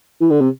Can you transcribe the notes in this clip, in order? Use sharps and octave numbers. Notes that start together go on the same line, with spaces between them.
E3
D3
C3